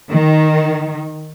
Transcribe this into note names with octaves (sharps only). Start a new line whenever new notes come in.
D#3